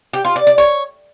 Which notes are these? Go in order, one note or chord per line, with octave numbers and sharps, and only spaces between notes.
G4
F4
D5
D5
C#5